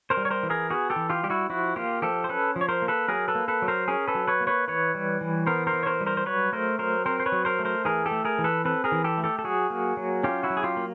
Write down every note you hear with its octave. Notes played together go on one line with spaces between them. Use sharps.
A#4 C5
G3
C#5
A#4 C5
E3
G#4 A#4
B3 F#4 G#4
G4 A4
E3
F4 G4
G3 G4
E4 F#4
F3 E4 F#4
A#3 F4 G4
F3 G4 A4
C5
C#4 A4 B4
F3
C#5
A#4 C5
A#3
A4 B4
F#3 G#4 A#4
A4 B4
A#3
A4 B4
F#3
A#4 C5
C#4 G#4 A#4
A4 B4
F#3
B4 C#5
A#3
B4 C#5
E3 B4 C#5
G3
E3
B3 A#4 C5
A#4 C5
E3
C#5
A#4 C5
G3
A#4 C5
C5
F#3 B4 C#5
A3 A#4 C5
F#3 A#4 C5
C4 A#4 C5
C5
B4 C#5
F#3
A#4 C5
A3
A#4 C5
E3 G#4 A#4
G4 A4
A3
G#4 A#4
E3
A4 B4
C4 A4 B4
G#4 A#4
E3
G4 A4
A3
G4 A4
A4
F#3 F#4 G#4
A#3
F#3
C#4 F4 G4
E4 F#4
F#3
G#4
F4 G4
A#3